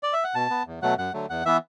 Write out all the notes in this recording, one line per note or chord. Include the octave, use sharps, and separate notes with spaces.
D5
E5
F#5
B2 A5
B3
E2
B2 F#3 A3 F#5
F#2 F#5
D3 F#3 A3
E2 F#5
E3 B3 E5